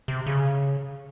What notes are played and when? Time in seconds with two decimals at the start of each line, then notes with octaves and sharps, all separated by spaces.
0.08 C3
0.26 C#3